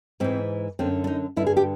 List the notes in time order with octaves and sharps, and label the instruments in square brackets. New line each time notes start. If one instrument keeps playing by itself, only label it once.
[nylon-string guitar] G#2 E3 C4
F#2 D3 C4
D4
D#4
G2 D3 E4
G#4
G4